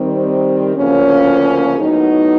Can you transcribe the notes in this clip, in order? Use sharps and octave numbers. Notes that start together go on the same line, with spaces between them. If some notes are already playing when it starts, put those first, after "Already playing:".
Already playing: D#3 G3 C4
D2 C#3 F3 A#3 C#4
A2 F#3 B3 D#4